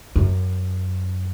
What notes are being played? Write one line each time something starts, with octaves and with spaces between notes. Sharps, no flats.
F#2